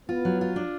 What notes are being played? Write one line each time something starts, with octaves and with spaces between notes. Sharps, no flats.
B3 F4
F#3
F4
D4